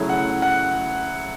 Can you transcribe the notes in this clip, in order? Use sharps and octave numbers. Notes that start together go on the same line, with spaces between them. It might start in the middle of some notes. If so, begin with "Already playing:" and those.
Already playing: C#3 F#3 A3 E4
F#5
F#5